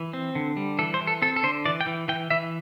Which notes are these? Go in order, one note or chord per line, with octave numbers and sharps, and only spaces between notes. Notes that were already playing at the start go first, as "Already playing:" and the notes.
Already playing: E3
C4
D3
G3
E3 A4
C5
E3
A4
C4 A4
A4
D3 C5
E3 D5
G5
E3
E3 G5
E3 E5